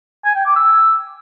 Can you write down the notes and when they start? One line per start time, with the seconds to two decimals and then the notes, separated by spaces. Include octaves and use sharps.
0.25 G#5
0.35 G5
0.46 D6
0.56 E6